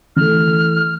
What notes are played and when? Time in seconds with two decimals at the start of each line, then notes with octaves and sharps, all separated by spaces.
0.16 E3 A3 F6